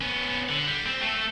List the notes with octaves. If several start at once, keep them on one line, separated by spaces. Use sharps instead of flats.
B3 C#4
D3
G3
C4
A3 A4